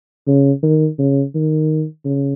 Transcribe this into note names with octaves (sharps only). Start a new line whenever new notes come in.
C#3
D#3
C#3
D#3
C#3